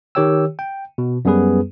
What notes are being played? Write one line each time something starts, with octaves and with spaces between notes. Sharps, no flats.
D#3 G4 C#5 G5 E6
G5
B2
F#2 G3 B3 G#4 B4